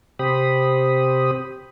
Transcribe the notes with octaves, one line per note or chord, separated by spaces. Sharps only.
C3 G4 C5 B5 D#6